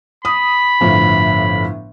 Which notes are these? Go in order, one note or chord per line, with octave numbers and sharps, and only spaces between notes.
B5 D#6
G1 A2 F3